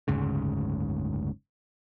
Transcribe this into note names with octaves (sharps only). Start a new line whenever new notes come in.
F#1 D2 G#2 C#3